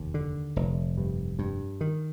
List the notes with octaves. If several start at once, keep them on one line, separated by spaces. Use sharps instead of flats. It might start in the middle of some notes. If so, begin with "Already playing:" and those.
Already playing: F1 D#2
D3
F1
G2
G2
D#3